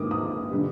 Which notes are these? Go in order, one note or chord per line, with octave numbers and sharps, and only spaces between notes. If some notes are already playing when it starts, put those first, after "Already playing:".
Already playing: G#2 D#3 A#3 D6 D#6
D#6
D3 G3